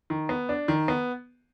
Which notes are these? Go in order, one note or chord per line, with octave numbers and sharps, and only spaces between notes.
D#3
B3
D4
D#3
B3